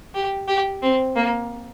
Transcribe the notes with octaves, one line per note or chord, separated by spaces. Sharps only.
G4
G4
C4
A#3